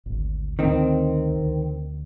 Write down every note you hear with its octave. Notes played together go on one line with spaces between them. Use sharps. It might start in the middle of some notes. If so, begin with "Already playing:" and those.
G#1 D2
D2 D#3 C4
D2